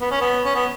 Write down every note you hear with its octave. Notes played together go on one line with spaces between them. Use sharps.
B3
C#4
B3
C#4
B3